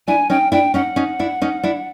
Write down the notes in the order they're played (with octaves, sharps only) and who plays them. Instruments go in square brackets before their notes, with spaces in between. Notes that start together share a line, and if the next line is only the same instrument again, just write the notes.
[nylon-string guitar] D4 E4 [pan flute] G#5
[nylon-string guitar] C#4 D#4 [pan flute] G5
[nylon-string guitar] D4 E4 [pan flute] G5
[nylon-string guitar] C#4 D#4 [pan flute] F#5
[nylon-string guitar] C#4 D#4
D4 E4
C#4 D#4
D4 E4